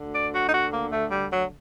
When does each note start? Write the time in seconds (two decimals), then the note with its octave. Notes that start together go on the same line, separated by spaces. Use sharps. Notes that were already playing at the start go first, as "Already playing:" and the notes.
Already playing: D2 D3
0.13 D5
0.33 F#4
0.47 D#4
0.52 F#4
0.71 A#3
0.91 A3
1.11 G3
1.31 F#3